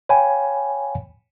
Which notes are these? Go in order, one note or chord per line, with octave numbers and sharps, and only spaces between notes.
C#5 F5 G5 G#5 B5